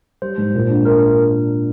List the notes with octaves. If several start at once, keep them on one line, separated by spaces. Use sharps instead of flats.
G3 C5
G#2
A#2
D4
A#4